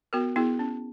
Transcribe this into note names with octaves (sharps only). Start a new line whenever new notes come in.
B3 F#4 A#4
B3 E4 G#4
C#4